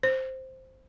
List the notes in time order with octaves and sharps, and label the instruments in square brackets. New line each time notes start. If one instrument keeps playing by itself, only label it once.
[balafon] C5